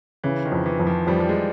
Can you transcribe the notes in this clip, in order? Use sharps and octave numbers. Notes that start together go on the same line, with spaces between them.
C#3 E3
D#3
F2
E3
F2
F3
F2 G3
G3
G#3